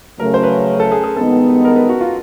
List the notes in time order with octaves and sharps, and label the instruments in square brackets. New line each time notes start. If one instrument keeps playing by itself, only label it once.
[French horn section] C#3 F#3 A3 [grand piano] A#4
[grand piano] C5
B4
A4
G#4
G#4
[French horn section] G2 D#3 G#3 B3 D#4 [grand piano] A4
[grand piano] A#4
B4
F#4
F4